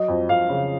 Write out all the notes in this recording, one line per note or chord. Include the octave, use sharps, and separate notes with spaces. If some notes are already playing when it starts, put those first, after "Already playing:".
Already playing: F#3 D#5
F2
F2 F5
C#3